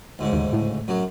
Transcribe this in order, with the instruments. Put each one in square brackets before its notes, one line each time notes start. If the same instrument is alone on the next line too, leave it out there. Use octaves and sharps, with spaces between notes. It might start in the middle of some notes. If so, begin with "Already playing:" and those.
[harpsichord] D2 G#2 C#3
[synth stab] D#2
A2
[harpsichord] F#2 F#3